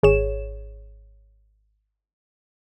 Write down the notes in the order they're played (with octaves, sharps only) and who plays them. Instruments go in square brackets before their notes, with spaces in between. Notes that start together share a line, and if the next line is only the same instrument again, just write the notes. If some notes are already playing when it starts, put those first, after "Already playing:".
[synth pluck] G#1 G#4 C#5 E7